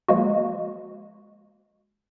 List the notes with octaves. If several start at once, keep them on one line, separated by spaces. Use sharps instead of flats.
F3 G#3 A#3 F#4